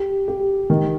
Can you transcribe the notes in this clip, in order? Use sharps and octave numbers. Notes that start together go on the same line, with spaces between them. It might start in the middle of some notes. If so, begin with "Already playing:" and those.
Already playing: G4
G4
D#3